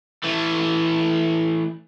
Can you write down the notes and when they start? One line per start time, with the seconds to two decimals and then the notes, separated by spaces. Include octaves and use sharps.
0.23 E3 A3